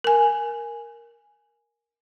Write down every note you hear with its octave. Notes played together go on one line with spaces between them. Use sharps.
A#4 G#5